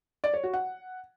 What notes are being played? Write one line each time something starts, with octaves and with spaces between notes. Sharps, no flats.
D5
C#5
F#4
F#5